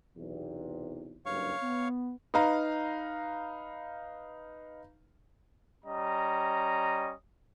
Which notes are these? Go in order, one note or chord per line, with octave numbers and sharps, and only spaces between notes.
B1 E2 C3
F#1 G2 C#5 F5 C#6
B3
D#4 B4 F5 A#5
G3 C#4 D#5 A#5